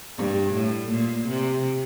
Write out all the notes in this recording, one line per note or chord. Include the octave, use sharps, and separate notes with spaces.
G2
A2
A#2
C3